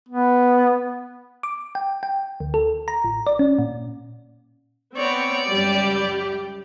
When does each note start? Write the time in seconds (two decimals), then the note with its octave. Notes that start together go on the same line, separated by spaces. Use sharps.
0.09 B3
1.43 D6
1.75 G5
2.03 G5
2.40 D2
2.54 A4
2.88 A#5
3.04 A1
3.27 D5
3.39 C#4
3.59 A#2
4.97 B3 C4 C#5 D5
5.49 C#2 F#2 G3 G4